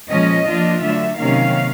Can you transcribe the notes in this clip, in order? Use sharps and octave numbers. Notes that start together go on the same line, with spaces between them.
A#2 F3 G#3 C#4 D#5
F3 A#3 D4 F4
D3 F#3 A3 E5
C3 D#3 F#3 A#3 C#4 F5